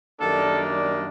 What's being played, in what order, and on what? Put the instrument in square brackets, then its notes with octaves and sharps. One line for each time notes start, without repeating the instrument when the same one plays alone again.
[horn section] F#2 D#3 G3 A#3 D4 A4